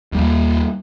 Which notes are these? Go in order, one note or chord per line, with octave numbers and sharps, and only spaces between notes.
D#2 G3 A#3